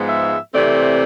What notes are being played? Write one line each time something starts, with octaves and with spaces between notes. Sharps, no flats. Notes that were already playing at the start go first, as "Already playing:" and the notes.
Already playing: G#2 F3 G#3 B3
E5
C3 E3 A3 C4 D5